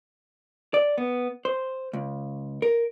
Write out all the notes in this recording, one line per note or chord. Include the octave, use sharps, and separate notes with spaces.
D5
B3
C5
C#2
A#4